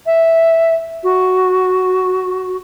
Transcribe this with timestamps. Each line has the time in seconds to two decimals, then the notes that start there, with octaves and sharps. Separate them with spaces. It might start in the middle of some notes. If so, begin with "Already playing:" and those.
0.06 E5
1.03 F#4